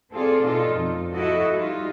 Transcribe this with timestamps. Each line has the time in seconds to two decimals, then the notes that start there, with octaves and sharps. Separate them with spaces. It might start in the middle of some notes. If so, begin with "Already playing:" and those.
0.12 C4 F4 G#4 A4 D5
0.41 B2 D#4 F4 A4
0.73 F2
1.14 E4 F#4 A4 D#5
1.53 G3 D#4 F4